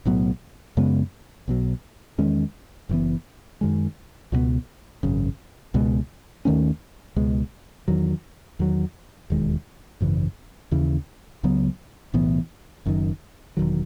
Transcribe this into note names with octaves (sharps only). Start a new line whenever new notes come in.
B1 A2 F#3 B3
F#2 C#3 G#3 B3
B1 B2 F#3
E2 D#3 G#3 C#4
F#1 F#2 E3 B3
F#2 D#3 G#3
C#2 B2 F#3 B3
G#1 F#2 C#3
C#2 B2 G#3
D#2 D#3 A3 C#4
C#2 B2 G#3
E2 D#3 F#3
E2 D#3 F#3
E1 D#2 D#3 G#3
G#1 F#2 C#3 E3
D#2 C#3 E3
C#2 C#3 F#3 B3
B1 A2 E3 B3
F#1 F#2 D#3
E1 E2 D#3 F#3